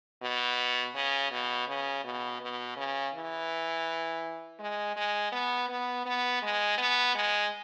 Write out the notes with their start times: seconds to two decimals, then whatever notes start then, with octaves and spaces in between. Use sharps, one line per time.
0.22 B2
0.95 C#3
1.32 B2
1.68 C#3
2.04 B2
2.41 B2
2.77 C#3
3.14 E3
4.59 G#3
4.96 G#3
5.32 B3
5.69 B3
6.06 B3
6.42 G#3
6.78 B3
7.15 G#3